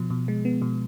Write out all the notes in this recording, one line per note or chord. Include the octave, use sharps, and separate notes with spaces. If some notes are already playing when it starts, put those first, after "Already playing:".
Already playing: B2 F3
B2
G#3
B3
B2